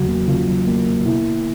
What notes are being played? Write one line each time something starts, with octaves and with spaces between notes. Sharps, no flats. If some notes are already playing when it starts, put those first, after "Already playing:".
Already playing: E2 C#3 F#3 F#4
A#3
C#3 F4
F#3
A#3
A#3
B2 E4